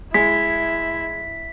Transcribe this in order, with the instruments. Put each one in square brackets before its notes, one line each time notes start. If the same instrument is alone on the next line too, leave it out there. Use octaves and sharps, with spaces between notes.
[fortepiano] G#3 [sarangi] E4 [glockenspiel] B6